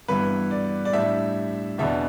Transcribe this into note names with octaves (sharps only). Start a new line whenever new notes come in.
G2 E3 B3 E4 B4
D5
D5
A2 G3 D4 E5
E2 B2 B3 D4 E5